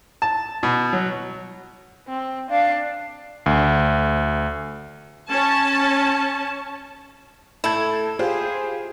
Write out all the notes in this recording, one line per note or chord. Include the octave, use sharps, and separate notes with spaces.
A5
B2
F#3
C4
D4 F5
D2
C#4 A5
A2 E4 A4 A5 G#6
F4 G4 G#4 C5